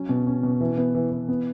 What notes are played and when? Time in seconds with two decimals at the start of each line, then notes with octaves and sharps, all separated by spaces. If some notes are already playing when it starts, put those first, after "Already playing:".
Already playing: F#3 C#4
0.09 B2
0.27 C#4
0.43 B2
0.60 E3
0.78 B3
0.95 E3
1.11 E3
1.29 B3